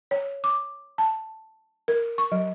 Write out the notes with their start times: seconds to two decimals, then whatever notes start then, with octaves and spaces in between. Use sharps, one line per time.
0.11 C#5
0.44 D6
0.98 A5
1.88 A#4
2.18 C#6
2.32 F#3